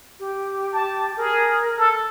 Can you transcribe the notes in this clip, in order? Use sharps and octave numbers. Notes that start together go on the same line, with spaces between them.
G4
A5
G#4 A#4
A4